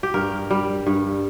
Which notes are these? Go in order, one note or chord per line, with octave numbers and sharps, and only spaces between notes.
G4
G2 A#4
G3
G2